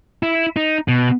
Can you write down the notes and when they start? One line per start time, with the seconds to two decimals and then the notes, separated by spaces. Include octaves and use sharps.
0.23 E4
0.57 D#4
0.88 B2